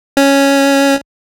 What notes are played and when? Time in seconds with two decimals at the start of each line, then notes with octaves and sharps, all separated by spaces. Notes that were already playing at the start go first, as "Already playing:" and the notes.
0.17 C#4